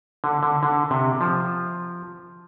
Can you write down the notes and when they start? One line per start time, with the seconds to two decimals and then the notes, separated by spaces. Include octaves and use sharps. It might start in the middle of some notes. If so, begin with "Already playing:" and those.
0.24 D3
0.43 D3
0.63 D3
0.91 C3
1.21 F3